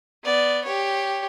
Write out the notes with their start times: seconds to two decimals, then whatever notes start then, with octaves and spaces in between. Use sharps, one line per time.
0.24 B3 D5
0.65 G4 C#5